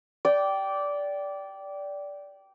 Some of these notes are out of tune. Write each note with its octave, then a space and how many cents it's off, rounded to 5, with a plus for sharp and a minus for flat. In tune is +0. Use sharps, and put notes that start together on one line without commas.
D5 -15 G5 -15